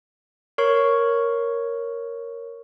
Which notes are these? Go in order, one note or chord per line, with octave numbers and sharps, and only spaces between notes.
A#4 C#5 C#6